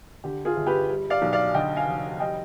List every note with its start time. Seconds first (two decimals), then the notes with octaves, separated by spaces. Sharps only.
0.24 D3 G4
0.45 F4 G#4
0.56 G1
0.67 G4 B4
0.89 G3
1.10 D5 F5
1.22 B1
1.33 D5 F5
1.54 D3 D#5 G5
1.76 F5 G#5
1.88 F1
2.20 G3 D#5 G5